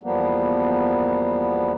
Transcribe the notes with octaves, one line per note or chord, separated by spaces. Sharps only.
E2 F3 G3 A#3 B3